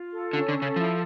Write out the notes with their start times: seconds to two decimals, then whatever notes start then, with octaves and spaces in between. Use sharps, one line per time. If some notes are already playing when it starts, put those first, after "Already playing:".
Already playing: F4
0.13 A4
0.33 D3 C#4
0.49 D3
0.55 A4
0.62 C#3
0.76 F3 E4